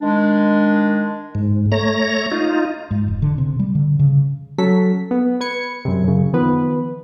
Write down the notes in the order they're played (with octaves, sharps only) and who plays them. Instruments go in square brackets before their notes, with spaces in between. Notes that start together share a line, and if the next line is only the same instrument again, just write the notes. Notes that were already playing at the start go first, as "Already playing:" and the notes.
[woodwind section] D#3 G#3 D4
[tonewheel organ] G#2
A3 C#5 A#5 A#6
D#4 F4
[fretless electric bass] G#2
F1
D3
C3
G3
D3
C#3
[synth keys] F#3 C#4 A4 B6
B3
B4 G#6 C#7
F#2 C3
F#2 C#3
D#3 F3 B3 B4